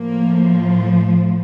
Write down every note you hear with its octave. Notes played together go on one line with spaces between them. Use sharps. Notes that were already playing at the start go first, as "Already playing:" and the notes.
Already playing: A2 F3 A#3